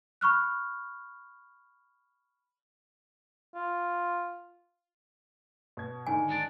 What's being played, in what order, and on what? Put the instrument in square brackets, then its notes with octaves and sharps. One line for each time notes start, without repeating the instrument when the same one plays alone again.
[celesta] B5 C#6 F6 F#6
[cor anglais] F4
[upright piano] B2 G#6
[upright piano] G#2 D3 D#3 [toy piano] G#5
[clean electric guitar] G#3 D4 D5